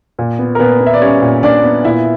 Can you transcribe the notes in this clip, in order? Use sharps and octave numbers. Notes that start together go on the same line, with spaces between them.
A#2
B3
A#4
A#2 B3 B4
B3
E5
D5
G3 C#4 C#5
A#2
A#2 D4 D5
B3
A#2 E4 E5